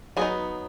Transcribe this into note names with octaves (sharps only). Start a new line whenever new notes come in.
F#3 B3 D#4 G#4